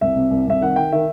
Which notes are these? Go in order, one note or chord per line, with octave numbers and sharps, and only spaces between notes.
C2 E5
C3
C2
C2 E5
D#3 F#5
D#3 G5
D#3 E5